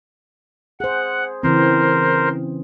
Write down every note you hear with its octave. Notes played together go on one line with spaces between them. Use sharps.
G#4 C5 F#5
C#3 E3 C4 A#4 C5